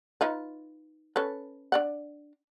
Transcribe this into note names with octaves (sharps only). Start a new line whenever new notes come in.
D#4 F4 B4
C#4 A4 B4
D4 D5 F#5